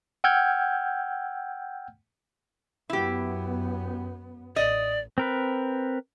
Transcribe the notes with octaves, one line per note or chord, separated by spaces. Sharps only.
F#5 G5 E6 F6 G6 G#6
F#2 B3 E4 G4
A1 D5 D#5
C4 A#4 B4